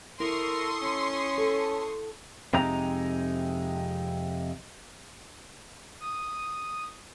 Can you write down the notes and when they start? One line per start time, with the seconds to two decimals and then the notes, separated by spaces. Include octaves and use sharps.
0.20 E4 A4 A#4 C6 C#6 D#6
0.82 C#4
1.38 A4 A5
2.54 F2 C3 G#3 D#4 A#5
6.01 D#6